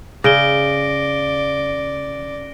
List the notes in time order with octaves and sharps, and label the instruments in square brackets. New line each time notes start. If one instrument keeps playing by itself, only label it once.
[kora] C#3 [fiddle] D5 [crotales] A#6 D7 G7